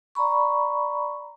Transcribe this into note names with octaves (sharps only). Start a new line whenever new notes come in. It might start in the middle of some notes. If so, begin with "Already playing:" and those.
D5 A#5 B5 C#6